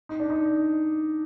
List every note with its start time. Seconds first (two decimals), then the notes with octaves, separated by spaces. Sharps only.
0.09 D#4
0.20 D4
0.30 D#4